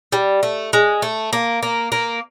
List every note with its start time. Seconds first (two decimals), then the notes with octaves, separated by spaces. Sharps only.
0.12 G3
0.43 A3
0.73 G#3
1.02 A3
1.33 A#3
1.63 A#3
1.92 A#3